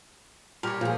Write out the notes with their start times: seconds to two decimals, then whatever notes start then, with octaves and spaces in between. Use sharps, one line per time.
0.63 A#2 G3 G4 A#4 C#5
0.81 A#2 F3 G#4